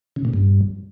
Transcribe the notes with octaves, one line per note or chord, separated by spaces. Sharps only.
C#3
A#2
G2